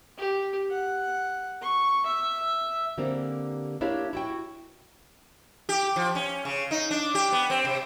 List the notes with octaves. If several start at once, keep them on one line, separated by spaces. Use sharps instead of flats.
G4
F#5
C#6
E5
D3 G3 A#3 C4 G4 A#4
A#3 D4 E4 G4 A#4 C#5
E4 F#4 G5
G4
F3
C#4
C#3
D#4
D4
G4
B3
C4
C3